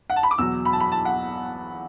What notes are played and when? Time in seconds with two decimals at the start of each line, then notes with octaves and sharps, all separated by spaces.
0.10 F#5
0.16 A5
0.23 B5
0.31 D6
0.38 E2 B2 F#3 E6
0.65 B5
0.73 A5
0.80 B5
0.92 A5
1.05 F#5